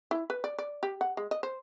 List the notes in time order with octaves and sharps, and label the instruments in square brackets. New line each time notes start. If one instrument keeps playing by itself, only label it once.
[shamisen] E4
B4
D5
D5
G4
F#5
G#3
D#5
C5